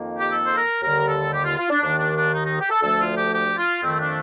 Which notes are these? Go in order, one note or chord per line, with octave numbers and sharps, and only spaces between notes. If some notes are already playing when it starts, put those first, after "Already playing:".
Already playing: F2 D#3 A#3
G4
A4
C5
A#4
D#2 D3 G3 A#4
A4
G4
F4
F4
D4
D#2 D#3 A#3 D4
D4
D4
D#4
D#4
G4
A4
D2 D3 F3 A3 A4
F4
G4
G4
F4
F2 D#3 A3 C4
D4